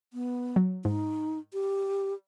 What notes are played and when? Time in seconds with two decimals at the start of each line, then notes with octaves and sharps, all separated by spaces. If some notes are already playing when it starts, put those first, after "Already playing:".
0.13 B3
0.56 F#3
0.85 G#2 D#4
1.53 G4